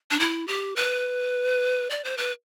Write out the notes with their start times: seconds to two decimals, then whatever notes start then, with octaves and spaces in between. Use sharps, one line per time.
0.11 D4
0.20 E4
0.48 G4
0.76 B4
1.90 D5
2.04 C5
2.17 B4